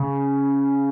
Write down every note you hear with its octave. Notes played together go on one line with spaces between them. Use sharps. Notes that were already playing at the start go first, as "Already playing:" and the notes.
Already playing: C#3